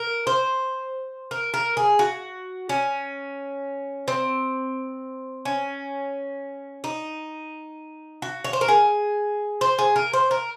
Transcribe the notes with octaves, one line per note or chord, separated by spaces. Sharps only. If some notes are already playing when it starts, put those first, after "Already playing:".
Already playing: A#4
C5
A#4
A#4
G#4
F#4
C#4
C4
C#4
D#4
F#4
C#5
C5
A#4
G#4
C5
G#4
A#4
C5
A#4